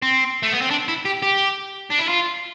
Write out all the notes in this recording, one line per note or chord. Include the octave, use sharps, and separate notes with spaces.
C4
A3
B3
C4
D4
E4
G4
G4
D4
E4
F4